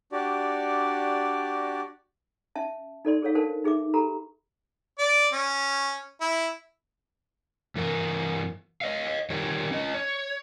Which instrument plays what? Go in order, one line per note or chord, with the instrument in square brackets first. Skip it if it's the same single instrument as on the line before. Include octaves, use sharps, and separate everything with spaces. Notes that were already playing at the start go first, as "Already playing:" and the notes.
[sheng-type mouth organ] D4 F#4 G4 D5
[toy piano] C#4 E5 A5
D#4 A4 D5 C6
G#4 A4 C#5 F5
D4 A4 A#4 C5 F5 A5
D#4 G#4 E5 D6
G4 A4 A#5 B5
[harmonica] D5
C#4
E4
[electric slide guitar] G2 E3 A#4
C#5 D#5 F5
D#3 G3 G4 A#4 C#5
C#4 D#5
C#5